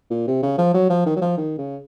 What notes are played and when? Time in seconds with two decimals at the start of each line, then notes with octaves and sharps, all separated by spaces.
0.10 A#2
0.27 C3
0.42 C#3
0.58 F3
0.74 F#3
0.89 F3
1.06 D#3
1.16 F#3
1.21 F3
1.37 D#3
1.58 C#3